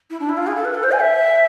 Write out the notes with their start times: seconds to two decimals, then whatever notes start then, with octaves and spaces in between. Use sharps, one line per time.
0.10 E4
0.19 D4
0.29 E4
0.37 F4
0.47 G#4
0.56 A4
0.64 B4
0.74 A4
0.83 C5
0.91 G#5
1.01 E5